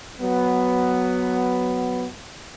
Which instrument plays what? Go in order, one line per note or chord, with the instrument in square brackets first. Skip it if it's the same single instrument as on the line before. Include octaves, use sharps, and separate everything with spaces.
[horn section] F#3 B3